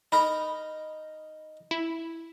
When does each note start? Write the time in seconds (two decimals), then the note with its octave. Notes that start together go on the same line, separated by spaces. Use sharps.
0.12 D#4 A#4 B5
1.71 E4